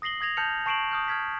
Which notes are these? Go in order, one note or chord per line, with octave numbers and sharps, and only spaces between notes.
D#6 A#6 C7 F#7 G7
D#6 G#6 A#6 F7
A5 F6 G6 C#7 F7
A5 C#6 C7 D7 E7 F#7
D#6 F6 G6
F6 G#6 B6